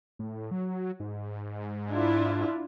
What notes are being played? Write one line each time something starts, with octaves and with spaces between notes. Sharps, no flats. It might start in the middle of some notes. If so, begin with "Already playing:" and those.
A2
F#3
G#2
D4 E4 F4